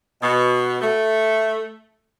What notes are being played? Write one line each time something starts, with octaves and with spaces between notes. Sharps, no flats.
B2
A3